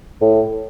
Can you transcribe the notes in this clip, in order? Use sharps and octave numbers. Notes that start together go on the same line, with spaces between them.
A2